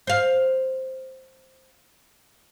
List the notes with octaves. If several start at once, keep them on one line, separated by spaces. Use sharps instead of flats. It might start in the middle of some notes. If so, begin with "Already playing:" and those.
C5 F5